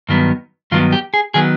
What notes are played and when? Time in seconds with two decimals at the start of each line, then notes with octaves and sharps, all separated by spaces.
0.09 G2 D#3 F#3 B3
0.71 G2 D#3 F#3 B3 F4
0.92 G4
1.14 G#4
1.34 D#3 F#3 B3 G#4